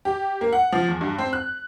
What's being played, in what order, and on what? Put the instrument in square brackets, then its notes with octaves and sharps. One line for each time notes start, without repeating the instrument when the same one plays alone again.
[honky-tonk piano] G4
A#3
F#5
F3
E2
G2
C4
F#6